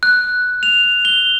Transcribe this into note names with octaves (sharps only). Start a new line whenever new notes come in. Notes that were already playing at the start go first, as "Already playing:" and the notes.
F#6
F7
G7